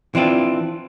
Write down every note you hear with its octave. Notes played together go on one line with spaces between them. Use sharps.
E3 C4 D4 F4